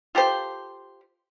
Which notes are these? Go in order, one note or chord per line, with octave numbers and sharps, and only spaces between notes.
F4 G4 A4 C5